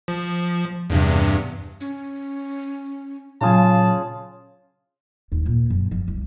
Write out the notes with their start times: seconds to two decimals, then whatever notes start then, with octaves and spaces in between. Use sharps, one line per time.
0.08 F3
0.90 E2 G2 C3
1.80 C#4
3.41 A#2 C#3 F#3 F4 G#4 A5
5.32 D#2
5.46 A#2
5.70 F#2
5.91 F3
6.08 C2